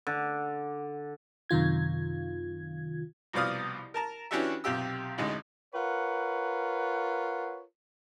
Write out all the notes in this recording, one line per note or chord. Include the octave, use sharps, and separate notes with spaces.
D3
F#2 C3 D#3 F4 G#6
C2 B2 F3 D5 F5 D#6
A#4 A5 A#5
E3 C#4 D4 F#4 G4 E5
B1 C3 F4 G4 E6
A1 D2 G#3 D#4
F4 A#4 B4 C#5 F#5